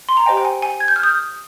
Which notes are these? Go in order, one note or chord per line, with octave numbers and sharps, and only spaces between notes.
C6
A#5
G4 C5 D#5 G5 G#5
G5
G#5
G#5
G#6
G6
F6
D#6 G6